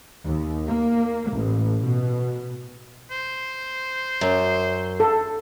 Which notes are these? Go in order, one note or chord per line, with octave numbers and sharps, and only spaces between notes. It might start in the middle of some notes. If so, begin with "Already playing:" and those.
D#2
A#3
A1
B2
C5
F#2
A4